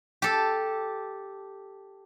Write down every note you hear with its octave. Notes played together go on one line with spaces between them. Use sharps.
G4 A4